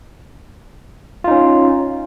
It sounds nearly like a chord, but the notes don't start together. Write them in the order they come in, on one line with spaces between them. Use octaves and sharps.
F4 D#4 C#4